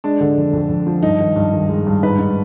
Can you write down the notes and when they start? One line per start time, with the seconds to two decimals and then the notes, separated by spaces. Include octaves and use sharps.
0.04 G#3 D4
0.21 D3
0.37 F2
0.53 F2
0.69 F2
0.87 F3
1.03 G2 D#4
1.20 D#3
1.36 G2
1.53 D#3
1.69 G#3
1.87 G2
2.03 G#2 B4
2.18 G#2